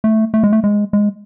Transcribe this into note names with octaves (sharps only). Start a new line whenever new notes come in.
A3
A3
G#3
A3
G#3
G#3